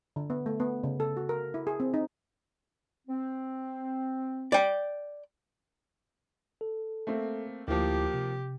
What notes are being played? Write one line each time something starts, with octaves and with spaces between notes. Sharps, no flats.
D3
B3
A3
B3
C#3
A4
F#4
A#4
E4
G#4
C4
D#4
C4
D5 G5
A4
A3 A#3 C4
D2 F3 A#3 E4 G4 D6
C3